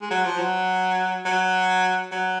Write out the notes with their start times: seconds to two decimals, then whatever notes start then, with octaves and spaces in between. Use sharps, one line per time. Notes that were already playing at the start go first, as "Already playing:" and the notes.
0.02 G#3
0.11 F#3
0.26 F3
0.39 F#3
1.25 F#3
2.11 F#3